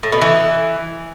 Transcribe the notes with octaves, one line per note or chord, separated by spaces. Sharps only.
A2
B2
E3